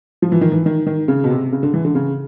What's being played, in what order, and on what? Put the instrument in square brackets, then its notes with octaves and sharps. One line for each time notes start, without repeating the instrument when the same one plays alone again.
[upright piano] F3
E3
D#3
E3
D#3
D#3
C#3
B2
C3
C#3
D3
E3
D3
C#3